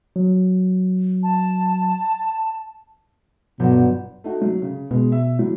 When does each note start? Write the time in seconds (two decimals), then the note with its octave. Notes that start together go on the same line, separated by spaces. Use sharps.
0.16 F#3
1.23 A5
3.59 G1 B2 F#3 G6
4.24 A3 D#4 F#4
4.41 F#3
4.62 C#3
4.91 B2 G#3
5.12 E5
5.39 E3 F#3